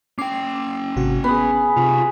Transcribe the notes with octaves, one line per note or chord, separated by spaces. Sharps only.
C#4 G5 D6 C7
G#1 C3 F#4
B3 G#4 B4
C3 F4 G4